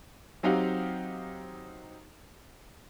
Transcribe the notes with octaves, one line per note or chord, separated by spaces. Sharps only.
F#3 C4 D#4 G4 F5 F#5